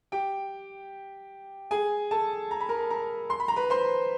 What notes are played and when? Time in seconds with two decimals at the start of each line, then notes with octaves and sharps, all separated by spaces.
0.12 G4 G5
1.71 G#4 G#5
2.11 A4 A5
2.51 A#5
2.60 B5
2.69 A#4 A#5
2.90 A#4 A#5
3.30 C6
3.40 B5
3.48 A#5
3.56 B4 B5
3.70 C5 C6